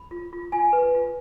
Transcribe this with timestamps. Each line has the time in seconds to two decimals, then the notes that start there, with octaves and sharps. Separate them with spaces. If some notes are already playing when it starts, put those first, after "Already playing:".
Already playing: B5
0.11 F4
0.33 F4
0.52 F4 G#5
0.73 B4
0.94 F4